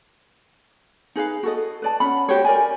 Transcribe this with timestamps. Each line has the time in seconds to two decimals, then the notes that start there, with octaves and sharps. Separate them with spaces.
1.16 D#4 G#4 B4 F5
1.43 F#4 A4 D#5
1.82 B4 D5 A5
2.00 C#4 F#5 B5
2.29 F#4 G4 C5 C#5
2.44 A#4 D5 G#5